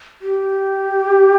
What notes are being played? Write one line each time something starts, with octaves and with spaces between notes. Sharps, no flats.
G4